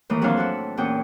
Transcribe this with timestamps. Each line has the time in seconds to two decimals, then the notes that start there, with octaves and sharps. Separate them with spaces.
0.09 D#2 A2 E3 A#3 D#6
0.22 F2 F#3 C4 D4 F5 A5
0.37 E4 F#4 A4
0.77 E2 A#2 C#4 F#4 G5 D#6